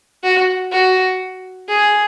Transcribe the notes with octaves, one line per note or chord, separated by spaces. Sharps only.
F#4
F#4
G#4